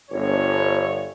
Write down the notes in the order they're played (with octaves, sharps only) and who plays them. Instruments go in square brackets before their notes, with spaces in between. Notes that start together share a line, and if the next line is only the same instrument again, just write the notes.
[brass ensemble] G1 C#5